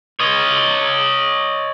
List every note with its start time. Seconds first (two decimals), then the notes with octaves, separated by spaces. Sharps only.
0.20 C#5 D#5